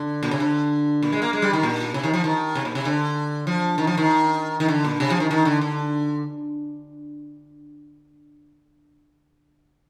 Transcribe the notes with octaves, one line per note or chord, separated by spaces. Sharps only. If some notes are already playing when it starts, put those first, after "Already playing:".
Already playing: D3
A#2
C3
D3
A#2
G#3
A#3
G#3
G3
D#3
A#2
C3
D#3
F3
D#3
C3
A#2
C3
D3
F3
D#3
F3
D#3
D#3
D3
A#2
C3
F3
D#3
D#3
D3
D3